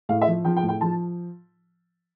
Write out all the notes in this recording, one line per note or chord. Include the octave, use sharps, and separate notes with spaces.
A2 F5
E5
F3
F3 G5
G5
A2
G5
F3 A5